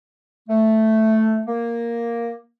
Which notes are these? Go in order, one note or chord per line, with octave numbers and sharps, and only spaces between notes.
A3
A#3